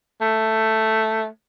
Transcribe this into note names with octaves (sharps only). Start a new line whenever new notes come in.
A3